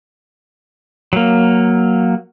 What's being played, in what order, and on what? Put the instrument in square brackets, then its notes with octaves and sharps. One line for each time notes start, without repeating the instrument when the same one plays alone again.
[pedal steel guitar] F#3 A#3